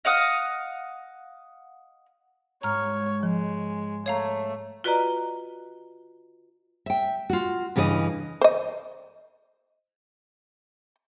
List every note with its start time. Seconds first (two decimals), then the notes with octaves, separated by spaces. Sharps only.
0.05 D#5 F5 F#5 D#6
2.63 G#2 C#5 A#5 F6
3.23 F3 G#3
4.06 A3 C#5 F5 A#5
4.84 F4 F#4 B4 D5 D#5 A#5
6.86 E5 G5
7.30 F4 F#4
7.76 G2 C#3 E3 A4 D#5
8.41 C5 D#5